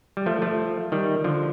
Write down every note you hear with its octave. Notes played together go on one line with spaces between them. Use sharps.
G3
F3 A3
F3 A3
D#3 G3
D3 F3